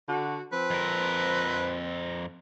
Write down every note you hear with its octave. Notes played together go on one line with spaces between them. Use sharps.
D3 F#4
F3 C4 B4
F2 A#4